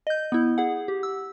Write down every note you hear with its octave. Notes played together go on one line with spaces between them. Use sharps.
D#5 G6
B3 E4
G#4 F#5
G4
E6